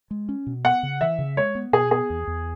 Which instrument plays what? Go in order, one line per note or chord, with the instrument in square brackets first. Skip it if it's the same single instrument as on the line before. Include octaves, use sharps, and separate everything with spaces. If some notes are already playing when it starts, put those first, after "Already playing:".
[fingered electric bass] G#3
C#4
B2
[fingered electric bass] B3 [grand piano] F#5
[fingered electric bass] C#3
[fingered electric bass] E3 [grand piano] E5
[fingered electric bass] C#3
[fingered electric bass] G#3 [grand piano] C#5
[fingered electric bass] B3
[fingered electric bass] B2 [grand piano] G#4
[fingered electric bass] B3 [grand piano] G#4
[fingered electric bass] E2
E2